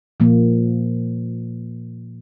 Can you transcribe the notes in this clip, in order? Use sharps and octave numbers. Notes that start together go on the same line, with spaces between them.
A#2 F3 A#3